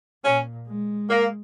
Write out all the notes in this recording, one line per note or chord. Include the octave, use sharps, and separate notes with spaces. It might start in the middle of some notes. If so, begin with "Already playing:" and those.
A#2 C#4
G#3
A#3